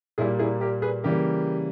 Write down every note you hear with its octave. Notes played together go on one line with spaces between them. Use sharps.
A#2 G3 A#3 E4 G#4
E4 G#4
G4 A#4
G#4 B4
C#3 E3 G3 A#3 G4 A#4